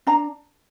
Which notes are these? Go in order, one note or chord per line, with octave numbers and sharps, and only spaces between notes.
D4 A#5